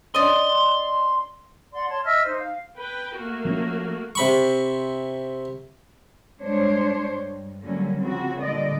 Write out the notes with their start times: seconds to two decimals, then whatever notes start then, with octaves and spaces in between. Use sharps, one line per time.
0.15 C#4 D4 D5 D#5 C6
1.73 D5 F#5 C6
1.89 C#5 A5 C6
2.04 D#5 E5 E6 F6
2.24 D#4 C5
2.39 F5
2.77 B4 G5
3.15 A3 A#3 F#4
3.45 F3 C4 C#4
4.15 C3 B5 C#6
6.41 G2 G#3 D4 C5 C#5
7.11 G2
7.65 D3 F#3 G3 A#3 C#4
8.00 C#3 F3 C4 F#4
8.41 A#2 D3 G3 D5 D#5